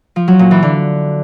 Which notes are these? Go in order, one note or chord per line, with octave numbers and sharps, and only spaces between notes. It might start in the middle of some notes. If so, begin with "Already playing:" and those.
F3
F#3
A#2
E3
D3